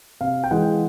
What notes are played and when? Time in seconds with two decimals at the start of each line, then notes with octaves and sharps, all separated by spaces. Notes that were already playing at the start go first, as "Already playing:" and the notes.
0.21 C3 F5
0.44 G5
0.51 E3 G#3 F#5